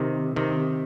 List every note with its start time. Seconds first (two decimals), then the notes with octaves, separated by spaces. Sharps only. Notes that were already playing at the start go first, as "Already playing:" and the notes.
Already playing: C3 D#3
0.36 C3 D#3